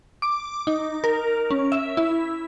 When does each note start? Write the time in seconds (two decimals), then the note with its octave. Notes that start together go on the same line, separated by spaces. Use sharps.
0.22 D6
0.67 D#4
1.04 A#4
1.51 C#4
1.72 E5
1.97 E4